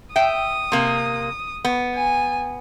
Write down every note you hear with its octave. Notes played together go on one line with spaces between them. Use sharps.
E5 G5 D#6
C3 A#3
B3
G#5